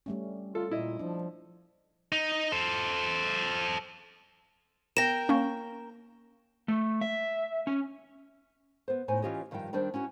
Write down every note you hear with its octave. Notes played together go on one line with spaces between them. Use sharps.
G3 A3 C#4
F4 A4
A#2 E4 D#5
F3 D4
D#4
A4 C5
B3 A#4 G5 A#6 E7
A#3 C#4 F5 C#6
A3
E5
C#4
B3 C5
A2 D#4 C5 G#5
E3 C#4 F4 G4 C#5 D#5
G2 D#3 F3 G3 G5
D#3 G3 D4 D#4 C5
C#4 E4 F#4